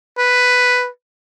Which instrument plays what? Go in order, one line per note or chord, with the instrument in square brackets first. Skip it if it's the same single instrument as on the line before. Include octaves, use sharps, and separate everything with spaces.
[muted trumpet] B4